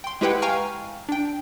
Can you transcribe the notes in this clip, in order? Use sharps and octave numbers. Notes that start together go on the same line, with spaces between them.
G5 C6
G#3 E4 G4 B4 F#5 G5
F5 G5 G#5 A#5 C#6 F6
D4 G5